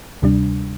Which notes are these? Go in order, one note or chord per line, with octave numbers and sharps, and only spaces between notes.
D2 C3 G3 D4